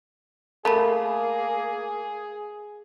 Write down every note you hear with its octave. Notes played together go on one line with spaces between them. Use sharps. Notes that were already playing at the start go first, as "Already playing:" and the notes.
A3 A#3 G#4 A#4 A#5 B5